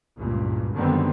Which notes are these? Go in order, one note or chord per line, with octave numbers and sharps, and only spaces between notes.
F#1 C#2 G2 A#2
F#2 D3 D#3 G3 B3 C4